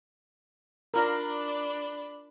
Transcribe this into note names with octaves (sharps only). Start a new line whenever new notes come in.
D4 F4 A#4 D5 B5